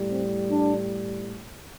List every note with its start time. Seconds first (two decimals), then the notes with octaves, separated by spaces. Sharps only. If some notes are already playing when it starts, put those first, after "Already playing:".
Already playing: A2 G3
0.09 C4
0.49 D4